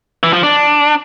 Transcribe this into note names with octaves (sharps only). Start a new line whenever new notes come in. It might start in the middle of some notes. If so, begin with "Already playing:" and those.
E3
F3
D4